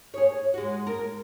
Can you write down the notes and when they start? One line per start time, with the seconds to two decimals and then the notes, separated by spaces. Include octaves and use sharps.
0.14 G#4 C#5
0.54 G#3 F#4
0.87 A#4